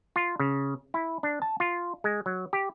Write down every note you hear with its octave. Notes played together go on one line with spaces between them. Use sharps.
F4
C#3
E4
D4
A5
F4
G#3
F#3
G4